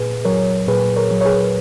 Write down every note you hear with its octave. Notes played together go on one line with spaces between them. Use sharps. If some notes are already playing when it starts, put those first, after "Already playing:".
Already playing: A#2 G#4 B4
F#3 A#4 C#5
A#2 G#4 B4
A#4 C#5
F#3
C#5
G#4 B4